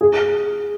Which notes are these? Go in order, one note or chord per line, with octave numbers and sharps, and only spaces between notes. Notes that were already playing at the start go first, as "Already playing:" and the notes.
G#4